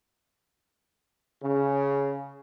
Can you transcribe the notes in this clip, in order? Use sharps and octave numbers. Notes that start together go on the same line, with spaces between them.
C#3